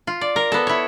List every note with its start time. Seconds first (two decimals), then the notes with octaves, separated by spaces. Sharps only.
0.07 F4
0.21 D5
0.36 A#4
0.52 B3 A4
0.67 E4 C#5